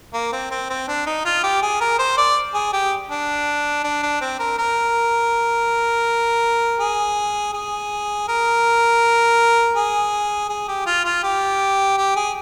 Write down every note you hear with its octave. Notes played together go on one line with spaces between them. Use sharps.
A#3
C4
C4
C4
D4
D#4
F4
G4
G#4
A#4
C5
D5
G#4
G4
D4
D4
D4
C4
A#4
A#4
G#4
G#4
A#4
G#4
G#4
G4
F4
F4
G4
G4
G#4